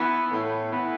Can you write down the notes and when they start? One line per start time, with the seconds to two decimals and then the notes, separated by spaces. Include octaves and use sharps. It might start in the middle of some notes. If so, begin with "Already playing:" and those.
Already playing: E3 B3
0.31 A2
0.72 E3 B3